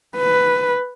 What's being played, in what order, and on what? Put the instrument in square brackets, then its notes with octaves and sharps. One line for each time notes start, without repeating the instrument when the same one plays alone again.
[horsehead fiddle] B4